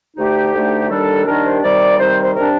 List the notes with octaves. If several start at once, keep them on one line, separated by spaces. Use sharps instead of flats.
D2 D3 A3 D#4 G4
D2 D3 A3 D#4
D#2 D#3 G3 D4 A4
D#2 D#3 G3 D4 A#4
C5
C3 D#3 G3 D5
C3 D#3 G3 C5
C5
C3 G3 D4 A#4